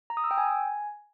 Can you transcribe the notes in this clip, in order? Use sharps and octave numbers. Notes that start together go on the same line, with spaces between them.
A#5
D#6
E6
G5
G#5